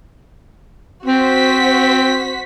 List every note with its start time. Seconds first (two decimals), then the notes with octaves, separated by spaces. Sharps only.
1.06 C4 F#4 C5 B6